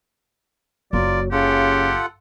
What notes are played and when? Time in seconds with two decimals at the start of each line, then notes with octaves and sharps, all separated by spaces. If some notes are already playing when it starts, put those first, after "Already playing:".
0.93 F#1 F#3 F4 A#4 D5
1.32 C#3 F4 G4 A4 F#5